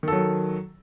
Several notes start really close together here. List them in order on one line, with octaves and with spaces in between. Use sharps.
D#3 A4 F#3